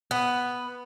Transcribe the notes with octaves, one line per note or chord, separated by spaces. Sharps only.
B3